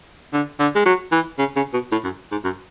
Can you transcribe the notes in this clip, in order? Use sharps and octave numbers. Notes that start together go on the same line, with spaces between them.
D3
D3
G#3
F#3
E3
C#3
C#3
B2
A2
F#2
G#2
F#2